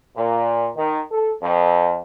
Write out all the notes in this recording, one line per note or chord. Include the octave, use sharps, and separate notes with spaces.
A#2
D#3
A4
F2